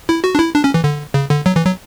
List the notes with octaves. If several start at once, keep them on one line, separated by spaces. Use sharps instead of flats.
E4
F#4
D4
E4
D4
C#4
E3
D3
C#3
D3
F#3
E3
F#3